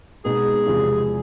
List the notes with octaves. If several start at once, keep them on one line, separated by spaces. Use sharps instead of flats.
B2 G#3 B3 D#4 F#4 G#4
E2 C3 F3 G#3